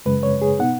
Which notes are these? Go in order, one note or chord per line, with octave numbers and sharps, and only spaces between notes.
F#2 C#3 G#3 B4
C#5
G#4
B2 B3 D#4 F#5